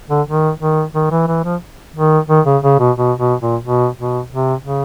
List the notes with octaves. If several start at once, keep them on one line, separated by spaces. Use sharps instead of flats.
D3
D#3
D#3
D#3
E3
E3
F3
D#3
D#3
C#3
C#3
B2
B2
B2
A#2
B2
B2
C3
C#3